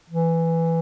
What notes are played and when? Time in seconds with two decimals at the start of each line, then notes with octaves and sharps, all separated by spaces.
0.10 E3